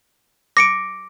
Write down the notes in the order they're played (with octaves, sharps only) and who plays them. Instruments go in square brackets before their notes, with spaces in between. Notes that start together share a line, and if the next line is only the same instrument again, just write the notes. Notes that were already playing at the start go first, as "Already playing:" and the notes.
[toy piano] D6 [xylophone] A#6 C#7 D7